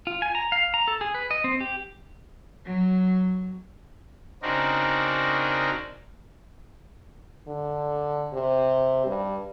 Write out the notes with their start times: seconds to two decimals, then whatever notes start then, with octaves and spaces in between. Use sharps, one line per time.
0.07 F4
0.22 G#5
0.35 A#5
0.52 F5
0.74 A#5
0.88 A4
1.01 G#4
1.14 B4
1.31 D#5
1.44 C4
1.60 G4
2.66 F#3
4.42 C#3 C4 D4 D#4 F#4 A#4
7.48 D3
8.34 C3
9.06 G2